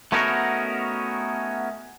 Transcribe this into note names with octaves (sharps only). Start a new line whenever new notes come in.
A3 B3 C#4 D#4 F#4 A#4